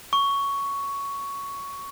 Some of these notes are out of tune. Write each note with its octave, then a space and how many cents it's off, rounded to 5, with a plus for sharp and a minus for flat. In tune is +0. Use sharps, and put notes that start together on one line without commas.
C#6 +10